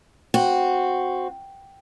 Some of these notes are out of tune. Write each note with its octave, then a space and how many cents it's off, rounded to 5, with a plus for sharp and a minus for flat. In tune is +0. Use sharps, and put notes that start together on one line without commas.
C4 +0 F#4 -5